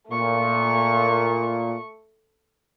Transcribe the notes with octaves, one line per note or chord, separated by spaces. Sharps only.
A#2 A3 C#6